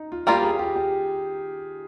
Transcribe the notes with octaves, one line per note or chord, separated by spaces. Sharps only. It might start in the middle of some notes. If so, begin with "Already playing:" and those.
Already playing: D#4
F4
G3 A#3 F4 G4 A#4 D5
G#4
G4
G4